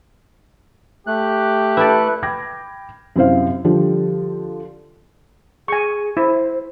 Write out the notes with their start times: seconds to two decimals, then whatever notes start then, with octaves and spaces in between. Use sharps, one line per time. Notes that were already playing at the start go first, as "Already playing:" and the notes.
1.07 A3 G4 F#6
1.77 E4 A4 B4 D5
2.23 G5 B5 D6 G#6 A#6
3.16 F#2 C3 E4 C5 F5
3.64 D3 F3 G3 G4
5.68 G#4 G#5 C#6
6.17 E4 C5